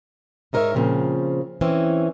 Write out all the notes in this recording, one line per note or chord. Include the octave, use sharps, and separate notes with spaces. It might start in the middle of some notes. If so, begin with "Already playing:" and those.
G#2 D#4 A#4 C5 C#5 E5
A#2 C#3 F3 C4
E3 C4 C#4